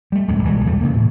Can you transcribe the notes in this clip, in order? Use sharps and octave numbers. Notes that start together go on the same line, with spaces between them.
G3 A3
D1 F#2 G#3
B1 E3 G3 G#3
E2 E3 G3 A3
C#3 A#3
A2